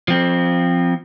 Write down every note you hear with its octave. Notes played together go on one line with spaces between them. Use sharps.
F3 C4